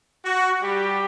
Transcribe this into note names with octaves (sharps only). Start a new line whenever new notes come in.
F#4
G3 G4